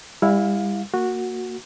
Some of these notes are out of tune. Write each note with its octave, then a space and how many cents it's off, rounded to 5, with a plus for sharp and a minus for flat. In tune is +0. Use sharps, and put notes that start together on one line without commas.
G3 +35 E4 +0 F5 +25
A#3 -15 F#4 -10